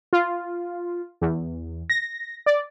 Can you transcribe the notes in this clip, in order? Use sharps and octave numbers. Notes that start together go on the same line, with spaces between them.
F4
E2
A#6
D5